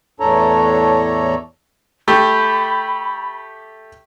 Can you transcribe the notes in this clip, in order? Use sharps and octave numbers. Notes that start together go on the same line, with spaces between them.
E2 A2 D4 A4 C#5 A#5
A3 G4 B5